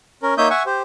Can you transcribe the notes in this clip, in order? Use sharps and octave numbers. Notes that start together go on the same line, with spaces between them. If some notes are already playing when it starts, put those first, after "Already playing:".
C#4 A#4
A#3 D#4 C#5 E5 D#6 G6
E5 F#5 G#5 C#6
G4 C5